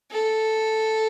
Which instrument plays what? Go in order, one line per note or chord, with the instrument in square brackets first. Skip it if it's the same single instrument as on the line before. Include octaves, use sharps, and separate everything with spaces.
[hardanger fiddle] A4